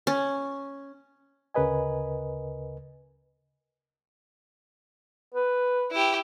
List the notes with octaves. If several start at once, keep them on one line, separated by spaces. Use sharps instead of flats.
C#4
D2 C#3 A#4 B4 D#5 G#5
B4
E4 G4